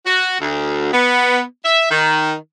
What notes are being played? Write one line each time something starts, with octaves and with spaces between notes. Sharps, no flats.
F#4
D2
B3
E5
D#3